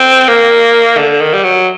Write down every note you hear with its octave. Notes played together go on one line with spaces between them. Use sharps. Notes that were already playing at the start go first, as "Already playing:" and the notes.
Already playing: C4
A#3
D3
D#3
G3
F#3